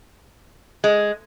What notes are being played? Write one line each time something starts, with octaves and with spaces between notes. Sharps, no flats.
G#3